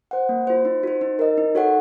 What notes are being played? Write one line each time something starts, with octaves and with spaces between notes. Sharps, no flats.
C5 F#5
A#3
F4 C5
D#4
F#4 C5
D#4
A#4 D#5
D#4
F#4 A4 C#5 F#5